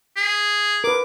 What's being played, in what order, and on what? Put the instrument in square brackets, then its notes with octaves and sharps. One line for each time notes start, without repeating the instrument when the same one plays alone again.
[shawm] G#4
[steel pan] A#4 B4 [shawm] D6